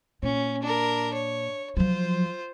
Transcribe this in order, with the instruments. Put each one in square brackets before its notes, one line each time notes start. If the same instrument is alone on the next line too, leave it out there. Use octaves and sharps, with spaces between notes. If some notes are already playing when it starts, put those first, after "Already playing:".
[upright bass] A#2 [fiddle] C#4
[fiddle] D4 A#4
C#5
[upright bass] F3 F#3 [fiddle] F4 C5